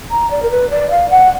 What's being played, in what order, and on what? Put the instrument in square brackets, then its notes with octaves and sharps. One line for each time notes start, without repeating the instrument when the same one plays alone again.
[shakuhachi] A#5
D5
A#4
B4
D5
F5
F#5